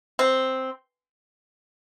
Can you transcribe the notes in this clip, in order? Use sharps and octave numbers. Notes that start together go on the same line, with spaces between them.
C4